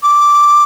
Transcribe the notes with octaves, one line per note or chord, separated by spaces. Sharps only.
D6